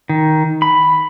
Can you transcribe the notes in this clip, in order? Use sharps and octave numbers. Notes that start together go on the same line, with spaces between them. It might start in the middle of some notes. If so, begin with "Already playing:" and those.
D#3
B5